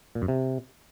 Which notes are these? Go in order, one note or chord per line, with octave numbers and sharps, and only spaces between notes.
A#2
F#2
C3